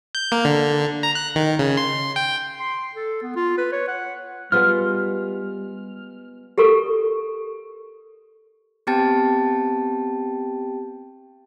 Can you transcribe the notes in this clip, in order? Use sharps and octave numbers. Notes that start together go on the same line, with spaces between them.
G6
A#3
D3
A#5
F#6
D#3
C#3
C6
G5
C6
A4
B3
F4
B4
C#5
F#5
G3 G#3 B3 F4 F6
G4 A4 A#4 C#6
B3 C4 G4 G5 A5 A6